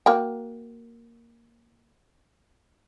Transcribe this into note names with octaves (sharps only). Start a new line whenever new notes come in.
A#3 F#4 G5